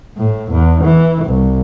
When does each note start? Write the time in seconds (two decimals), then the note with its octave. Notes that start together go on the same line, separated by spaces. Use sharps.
0.18 A2
0.52 E2
0.84 E3
1.25 C2